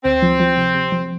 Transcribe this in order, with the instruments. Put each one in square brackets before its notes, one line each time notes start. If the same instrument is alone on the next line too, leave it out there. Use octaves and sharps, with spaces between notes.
[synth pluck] D2 [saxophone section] C4
[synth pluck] F3
F3
C3
C3
F3